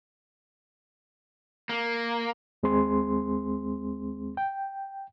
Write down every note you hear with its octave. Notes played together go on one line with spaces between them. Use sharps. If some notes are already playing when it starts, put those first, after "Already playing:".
A#3
D#2 G#3 C4 G#4 C6
G5